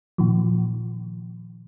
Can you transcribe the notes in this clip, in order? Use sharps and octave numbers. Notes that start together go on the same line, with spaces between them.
A#2 D#3 F3